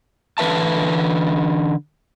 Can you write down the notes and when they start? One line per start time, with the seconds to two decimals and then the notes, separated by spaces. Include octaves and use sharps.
0.38 D3 E3 B4 E5 A5